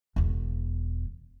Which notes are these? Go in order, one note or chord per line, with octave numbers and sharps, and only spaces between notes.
E1 E2